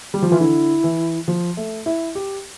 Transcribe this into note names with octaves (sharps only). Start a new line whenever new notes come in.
G3 G4
F3
E3 F4
D3 E4
E3
F3
A3
E4
G4